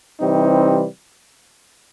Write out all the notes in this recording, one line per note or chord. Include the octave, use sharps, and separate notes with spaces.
C3 E3 G3 C4 D#4